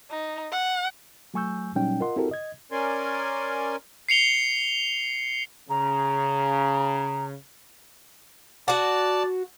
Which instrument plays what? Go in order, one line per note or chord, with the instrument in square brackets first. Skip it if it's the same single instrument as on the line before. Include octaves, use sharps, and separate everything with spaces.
[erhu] D#4
F#5
[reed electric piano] F#3 A3 G#5 C#6 E6 G6
A#2 F#3 G3 C#4 D#4 G5
F4 A#4 D#5 F#5 C6
C4 E4 F#4 G4 A4 A#4
D#5 G#6
[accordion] C#4 A#4 D5 G#5 C6
[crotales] C7 C#7 F7 G7
[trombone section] C#3 [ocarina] A#5
[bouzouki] F#4 F#5 [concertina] D5 A5